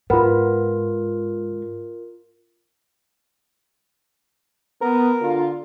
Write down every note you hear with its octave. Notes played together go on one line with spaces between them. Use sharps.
G#2 B3 F4 A#4
B3 A#4
D3 F4